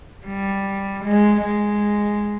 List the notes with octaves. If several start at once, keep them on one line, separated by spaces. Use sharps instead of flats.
G3
G#3
G#3